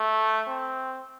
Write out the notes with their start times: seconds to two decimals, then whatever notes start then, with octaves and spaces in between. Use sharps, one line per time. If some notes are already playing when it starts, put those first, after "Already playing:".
Already playing: A3
0.48 C4